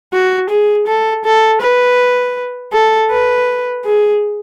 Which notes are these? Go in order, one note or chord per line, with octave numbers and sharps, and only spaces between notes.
F#4
G#4
A4
A4
B4
A4
B4
G#4